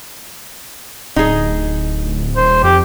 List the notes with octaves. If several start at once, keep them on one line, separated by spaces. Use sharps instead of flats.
D1 D#4 G#4
D#1 C5
F2 G4